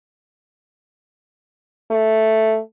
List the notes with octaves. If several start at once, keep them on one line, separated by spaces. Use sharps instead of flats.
A3